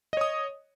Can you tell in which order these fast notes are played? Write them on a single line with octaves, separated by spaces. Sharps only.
D#5 C#5 D#6